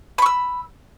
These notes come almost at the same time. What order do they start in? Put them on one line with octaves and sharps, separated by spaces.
B5 C#6 E6